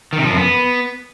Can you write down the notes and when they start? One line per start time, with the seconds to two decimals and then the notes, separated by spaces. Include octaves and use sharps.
0.13 D#3
0.18 C3
0.24 F3
0.30 F#2
0.36 B3